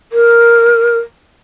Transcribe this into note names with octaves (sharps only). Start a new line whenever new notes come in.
A#4